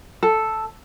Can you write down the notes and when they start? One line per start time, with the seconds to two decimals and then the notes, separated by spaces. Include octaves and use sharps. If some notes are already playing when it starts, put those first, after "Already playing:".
0.23 A4